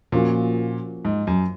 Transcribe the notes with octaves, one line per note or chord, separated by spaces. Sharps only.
A#2 F3 A#3 C#4 F#4
G#2
F#2